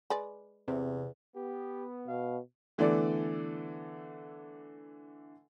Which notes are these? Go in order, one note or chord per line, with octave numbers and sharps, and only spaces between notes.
G#3 B4 D5
E2 C3
B3 G4
B2 F5
D3 E3 A3 B3 A4 D5